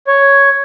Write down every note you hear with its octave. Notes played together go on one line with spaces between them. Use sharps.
C#5